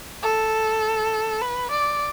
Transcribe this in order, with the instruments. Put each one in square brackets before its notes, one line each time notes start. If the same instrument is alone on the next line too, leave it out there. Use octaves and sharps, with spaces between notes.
[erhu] A4
B4
D5